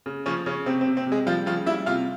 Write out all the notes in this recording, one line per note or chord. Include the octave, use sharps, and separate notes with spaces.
C#3
C#3 F3 C#4
C#3 C#4
C3 C4
C4
C3
C4
C3
G#3 G#4
F3 G3 F4
C#3 F3 F4
G3 E4 E5
C3 F4 F5